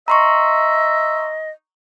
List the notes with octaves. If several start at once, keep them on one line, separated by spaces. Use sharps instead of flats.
D#5 E5 A#5 C6 C#6